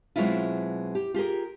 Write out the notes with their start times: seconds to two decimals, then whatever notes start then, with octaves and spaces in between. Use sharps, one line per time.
0.16 B2 F#3 G#3 C4 E4 F4
0.95 G4
1.14 F4 G4 G#4 A#4